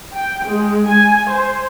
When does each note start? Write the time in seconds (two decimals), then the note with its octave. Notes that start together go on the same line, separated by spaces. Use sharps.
0.16 G5
0.47 G#3
0.88 G#5
1.30 C5